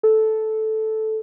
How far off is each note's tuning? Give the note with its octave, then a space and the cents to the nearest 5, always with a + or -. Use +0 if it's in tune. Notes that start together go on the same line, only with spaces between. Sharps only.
A4 -10